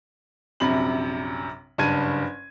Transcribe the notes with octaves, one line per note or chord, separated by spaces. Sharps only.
A#1 F#2 C3 B5 F#7
F#1 G2 A5 G#6 D#7